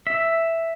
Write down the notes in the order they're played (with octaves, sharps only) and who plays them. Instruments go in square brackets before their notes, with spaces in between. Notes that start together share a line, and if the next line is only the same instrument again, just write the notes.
[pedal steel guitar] E5